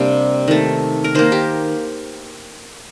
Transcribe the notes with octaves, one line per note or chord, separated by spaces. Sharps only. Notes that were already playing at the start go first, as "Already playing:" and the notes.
Already playing: C3 G3 A#3 D4
D#3 A3
A#4
D#3 A#3 C5
G4